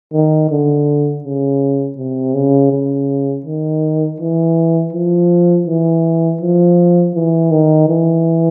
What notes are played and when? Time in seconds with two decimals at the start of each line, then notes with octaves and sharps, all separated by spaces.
0.13 D#3
0.50 D3
1.24 C#3
1.98 C3
2.34 C#3
2.72 C#3
3.45 D#3
4.20 E3
4.93 F3
5.67 E3
6.41 F3
7.15 E3
7.51 D#3
7.89 E3